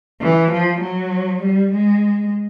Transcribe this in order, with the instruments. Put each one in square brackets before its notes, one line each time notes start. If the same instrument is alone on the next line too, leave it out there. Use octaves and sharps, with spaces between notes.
[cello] E3
F3
F#3
G3
G#3